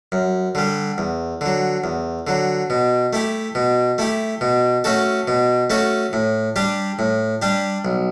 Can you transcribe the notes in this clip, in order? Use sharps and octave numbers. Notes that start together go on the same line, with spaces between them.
F#2
D3 G3
E2
D3 F#3
E2
D3 F#3
B2
A3 E4 G4
B2
A3 E4 G4
B2
A3 C#4 F#4 A4
B2
A3 C#4 F#4 A4
A2
G3 D4 G4
A2
G3 D4 G4
B1